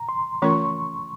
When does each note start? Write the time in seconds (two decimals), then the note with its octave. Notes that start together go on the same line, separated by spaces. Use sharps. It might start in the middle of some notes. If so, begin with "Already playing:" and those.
Already playing: A#5
0.09 C6
0.42 E3 A3 C#4 F4 A#4 C#6